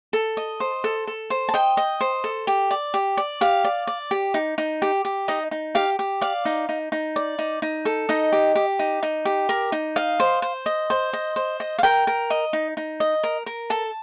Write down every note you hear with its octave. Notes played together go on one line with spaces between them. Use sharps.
A4
D#5
C5
A4
A4
C5
A5
D#5 G5
D#5
C5
A4
G4
D5
G4
D5
G4 F5
D5
D5
G4
D#4
D#4
G4
G4
D#4 D#5
D#4
G4 F5
G4
D5 F5
D#4
D#4
D#4
D5
D#4
D#4
A4
D#4 D#5
G4
G4
D#4
D#4
G4
A#4
D#4
D#5 F5
C5
C5
D#5
C5
D#5
C5
D#5
F5
A#4 G5
A#4
D#5
D#4
D#4
D#5
A#4
A#4
A4 A5